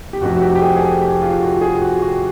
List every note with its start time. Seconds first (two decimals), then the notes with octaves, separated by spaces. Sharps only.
0.13 G4
0.21 F1 F2 C3 F#4
0.37 F#4
0.42 G4
0.55 G4
0.62 G#4
0.76 G#4
0.82 A4
1.01 G4
1.22 F4
1.42 F#4
1.61 G#4
1.82 F#4
2.02 F#4